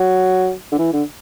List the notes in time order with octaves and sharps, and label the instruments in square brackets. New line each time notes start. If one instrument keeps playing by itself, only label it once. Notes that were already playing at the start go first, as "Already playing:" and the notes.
Already playing: [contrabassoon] F#3
D3
E3
D3